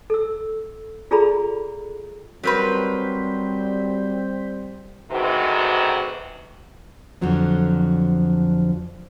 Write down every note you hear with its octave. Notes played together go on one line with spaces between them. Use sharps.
A4 E6
F4 G#4 A4 D5 A#5 B5
F#3 G3 C4 A#4 B4 C6 G6 B6
D2 G#2 C3 D#3 F#4 B4
F2 D3 F3 F#3 C4